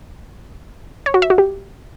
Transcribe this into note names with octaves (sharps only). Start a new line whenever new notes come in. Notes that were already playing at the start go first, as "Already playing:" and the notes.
C#5
F#4
E5
F#4
G4